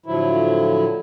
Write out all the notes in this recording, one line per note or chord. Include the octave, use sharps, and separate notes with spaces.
A2 D3 F3 F#3 E4